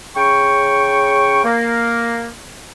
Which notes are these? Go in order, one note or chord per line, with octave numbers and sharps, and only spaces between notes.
C#3 G5 C#6
A#3